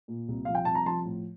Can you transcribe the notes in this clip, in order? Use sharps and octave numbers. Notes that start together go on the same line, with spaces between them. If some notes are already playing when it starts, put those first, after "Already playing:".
A#2
C2
F3 F5
G5
C2 A5
A#5
F3 A5 C6
A2